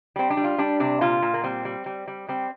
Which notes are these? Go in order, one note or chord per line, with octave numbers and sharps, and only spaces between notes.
G3 C4
D4
G3
F4
G3 D4
C3 D4
A#2 F4
A#2
A#3
G3 C4
G3
G3
G3
G3 C4